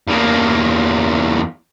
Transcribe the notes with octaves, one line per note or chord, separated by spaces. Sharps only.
E2 A#3